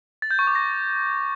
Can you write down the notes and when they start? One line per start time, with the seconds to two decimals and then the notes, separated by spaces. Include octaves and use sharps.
0.22 A6
0.31 G6
0.39 C#6
0.47 D6
0.55 A#6